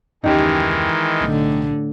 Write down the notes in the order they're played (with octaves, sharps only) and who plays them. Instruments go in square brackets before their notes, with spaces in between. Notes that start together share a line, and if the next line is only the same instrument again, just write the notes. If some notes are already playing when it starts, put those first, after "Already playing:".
[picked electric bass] F#1 D#2 C#4 [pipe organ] D#3 E3 G#3 [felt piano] D#4 G4
[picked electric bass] B1 [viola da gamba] A2 D3